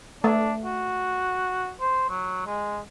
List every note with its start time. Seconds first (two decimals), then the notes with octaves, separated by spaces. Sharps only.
0.24 A3 D4
0.65 F#4
1.81 C5
2.09 F#3
2.46 G#3